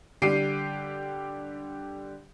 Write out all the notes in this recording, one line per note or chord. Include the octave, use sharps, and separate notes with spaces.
D3 G3 G4 G5 C7 D#7